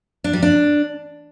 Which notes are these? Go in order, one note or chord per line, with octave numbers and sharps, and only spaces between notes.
D4
G3
D4